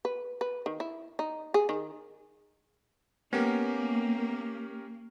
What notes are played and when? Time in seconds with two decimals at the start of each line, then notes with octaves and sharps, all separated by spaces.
0.05 B4
0.41 B4
0.66 D#3
0.80 E4
1.19 D#4
1.54 G#4
1.69 D#3
3.33 A#3 B3 C#4 G4 A#4